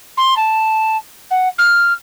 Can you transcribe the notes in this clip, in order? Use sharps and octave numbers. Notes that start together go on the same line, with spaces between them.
C6
A5
F#5
F6